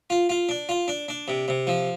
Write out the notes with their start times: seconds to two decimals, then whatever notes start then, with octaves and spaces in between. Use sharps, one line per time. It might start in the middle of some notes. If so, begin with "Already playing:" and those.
0.10 F4
0.29 F4
0.49 D4
0.69 F4
0.88 D4
1.08 D4
1.28 C3
1.48 C3
1.67 F3